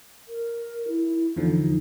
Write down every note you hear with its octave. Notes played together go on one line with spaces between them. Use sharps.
A#4
E4
E4
E2 D3 F3 D#4